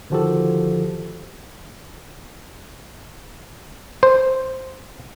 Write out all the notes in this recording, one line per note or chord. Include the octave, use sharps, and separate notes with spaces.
D3 D#3 F3 F#4 G4 A4
C5